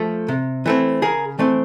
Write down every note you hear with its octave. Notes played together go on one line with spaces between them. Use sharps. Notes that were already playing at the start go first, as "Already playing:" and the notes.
Already playing: F3 A3
C3
E3 A3 C4
C#3 G#4 A#4
E3 A3 C4